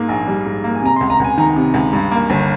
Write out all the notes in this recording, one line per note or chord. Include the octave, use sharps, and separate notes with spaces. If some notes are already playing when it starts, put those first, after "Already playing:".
Already playing: G#2 A#3
A#1
G3
G#2
A#3
G#5
C3 A#5
C#2 C6
A#5
C#2 G#5
D#3 A#5
C3
C#2
G2
A#3
G1